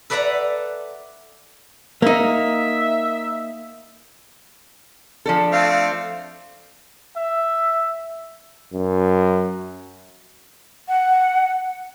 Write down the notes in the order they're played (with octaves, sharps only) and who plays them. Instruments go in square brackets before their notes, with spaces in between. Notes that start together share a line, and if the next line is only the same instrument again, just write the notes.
[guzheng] A4 B4 D5 E5 F#5 A#5
[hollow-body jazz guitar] A#3 D#4 [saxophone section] E5
[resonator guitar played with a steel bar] F3 D4 A4
[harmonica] A3 C4 F5
[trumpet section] E5
[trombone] F#2
[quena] F#5